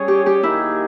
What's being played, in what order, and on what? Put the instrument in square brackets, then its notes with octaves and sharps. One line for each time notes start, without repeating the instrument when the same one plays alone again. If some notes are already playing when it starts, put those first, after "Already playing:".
Already playing: [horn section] G3 C#4 G#4 C#5
[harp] G4
G4
[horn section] D#3 A#3 D#4 G#4 [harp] E4